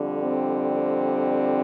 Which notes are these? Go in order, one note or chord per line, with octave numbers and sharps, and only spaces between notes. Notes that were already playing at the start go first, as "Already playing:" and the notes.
Already playing: F2 D3 G3
C4